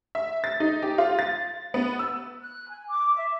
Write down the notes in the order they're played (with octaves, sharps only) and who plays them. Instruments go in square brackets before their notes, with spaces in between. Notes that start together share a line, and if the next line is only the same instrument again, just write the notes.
[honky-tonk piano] E5
A6
D#4
G4
F4
A6
B3
E6
[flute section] F#6
G#5
D6
E5